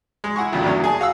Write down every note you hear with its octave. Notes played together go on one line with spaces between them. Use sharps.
G#3
E4 F#5 G#5 C#6
A1 D2 A#2 C#3 F#3
E2 G2 D3 F#3 A#3 C#4
G#4 G#5 A5
F#4 F5 F#5 E6